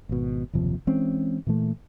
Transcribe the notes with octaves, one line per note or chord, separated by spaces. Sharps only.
G#1 B2
F#1 D#2 C3 F3
E3 G#3 C4 C#4
A#2 E3 A3